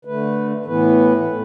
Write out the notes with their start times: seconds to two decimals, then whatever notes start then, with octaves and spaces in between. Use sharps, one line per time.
0.05 D3 A3 B4
0.65 A2 E3 B3 B4
1.25 A2 A3